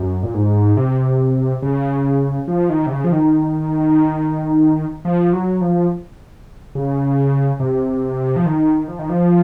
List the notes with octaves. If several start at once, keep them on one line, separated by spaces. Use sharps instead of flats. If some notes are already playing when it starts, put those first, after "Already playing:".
Already playing: F#2
A#2
G#2
C3
C#3
F3
D#3
C3
C#3
F3
D#3
F3
F#3
F3
C#3
C3
F3
D#3
F3
D#3
F3